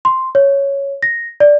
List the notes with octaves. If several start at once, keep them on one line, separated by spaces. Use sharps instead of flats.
C6
C#5
A#6
D5